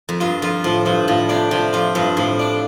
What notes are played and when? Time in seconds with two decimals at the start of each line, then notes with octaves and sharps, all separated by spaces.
0.09 F2
0.20 G2 F4
0.42 F2 F4
0.64 A2 F3
0.85 G2 F3
1.08 A2 F3
1.29 C3 D4
1.51 C3 F3
1.73 F2 F4
1.95 G2 F3
2.17 A2 F3
2.40 D4